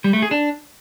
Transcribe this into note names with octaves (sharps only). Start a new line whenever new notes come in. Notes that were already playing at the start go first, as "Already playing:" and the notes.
G3
A3
G#4
D4